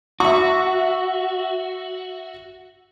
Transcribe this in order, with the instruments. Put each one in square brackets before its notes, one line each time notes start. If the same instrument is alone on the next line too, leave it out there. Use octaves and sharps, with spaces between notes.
[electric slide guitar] F#4 [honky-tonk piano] E5 C#6